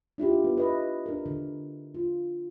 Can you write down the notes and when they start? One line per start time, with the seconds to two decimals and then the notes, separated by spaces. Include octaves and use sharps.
0.18 D4 E4 F4 G4
0.44 B3
0.57 B4 D#5 E5
1.06 D4 A#4
1.26 D3
1.94 F4